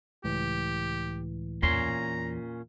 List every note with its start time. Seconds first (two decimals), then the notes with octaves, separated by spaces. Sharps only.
0.24 C#2 A2 E3 G4
1.62 E2 A#2 C#4 A#5 C6